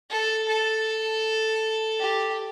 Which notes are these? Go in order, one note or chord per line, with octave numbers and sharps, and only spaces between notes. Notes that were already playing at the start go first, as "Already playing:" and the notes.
A4
A4
G4